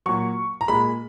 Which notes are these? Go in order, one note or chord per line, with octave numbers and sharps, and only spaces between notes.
A#2 F#3 C#6
A#5
A#2 G#3 B5